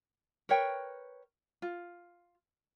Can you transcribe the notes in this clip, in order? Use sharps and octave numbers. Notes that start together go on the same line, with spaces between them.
A#4 B4 C#5 G5
F4